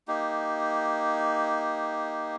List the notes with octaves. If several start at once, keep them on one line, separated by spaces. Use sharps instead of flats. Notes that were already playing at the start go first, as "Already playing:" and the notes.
A#3 D#4 G4